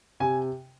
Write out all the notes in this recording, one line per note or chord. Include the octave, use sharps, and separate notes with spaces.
C3 G#5